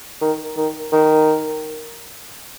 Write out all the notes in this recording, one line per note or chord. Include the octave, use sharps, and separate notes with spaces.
D#3
D#3
D#3